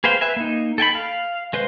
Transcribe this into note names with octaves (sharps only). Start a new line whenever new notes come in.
G#4 B4 C5 F5 G5
B4 E5 G#5
A#3 D#4
A4 G5 G#5 B5
F5
G#3 B4 C5 F5